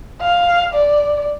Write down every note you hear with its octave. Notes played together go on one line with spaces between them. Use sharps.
F5
D5